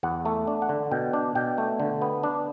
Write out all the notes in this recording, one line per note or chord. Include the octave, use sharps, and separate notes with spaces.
E2 F#5
A3
D4
F#5
D3
B2 G5
D4
B2 G5
A3
D3
B3
D4